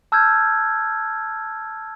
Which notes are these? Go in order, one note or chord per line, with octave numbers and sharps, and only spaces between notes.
A5 E6 F6 G6 G#6